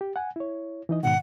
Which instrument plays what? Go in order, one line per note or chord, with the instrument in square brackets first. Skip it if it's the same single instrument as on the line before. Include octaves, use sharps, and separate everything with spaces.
[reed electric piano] G4
F#5 G#5
E4 C#5
E3 D#4 D#5
[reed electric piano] G#2 B2 D#3 [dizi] F#5